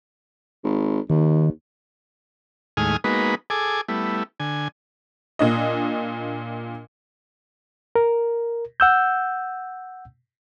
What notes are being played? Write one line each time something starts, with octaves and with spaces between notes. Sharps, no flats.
G#1
D#2 D#3
D#2 A2 G#3 G#5 D#6 F6
G#3 A#3 B3 D#4 F#4 B4
G#4 A4 G#5 D6
G3 A3 B3 E4
D3 G#5
A#2 D4 D#5
A#4
F#5 E6 G6